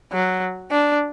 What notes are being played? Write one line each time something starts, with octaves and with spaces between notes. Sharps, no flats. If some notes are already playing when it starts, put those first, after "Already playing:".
F#3
D4